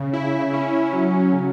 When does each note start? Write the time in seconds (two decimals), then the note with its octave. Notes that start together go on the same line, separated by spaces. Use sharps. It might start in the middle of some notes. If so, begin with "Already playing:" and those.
Already playing: C#3
0.13 E4
0.54 C#4
0.93 F#3
1.33 C#3